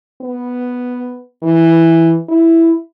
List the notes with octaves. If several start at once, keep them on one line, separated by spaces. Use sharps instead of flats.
B3
E3
E4